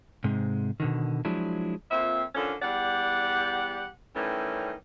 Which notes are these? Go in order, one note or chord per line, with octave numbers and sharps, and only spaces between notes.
G#2 C3 G#3
B2 D3 D#3
F3 F#3 G#3 D4 E4
F2 A#2 C4 E5
D3 D#3 F3 C#4 D4 A4
E2 G3 G4 D5 F#5
D#3 E3 G3 A3 C#4